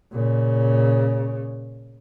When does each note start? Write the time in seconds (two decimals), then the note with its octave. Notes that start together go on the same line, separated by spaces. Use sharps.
0.12 A#2 C#3